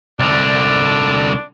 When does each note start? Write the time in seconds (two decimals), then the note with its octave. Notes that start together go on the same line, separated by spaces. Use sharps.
0.19 C2 D3 D4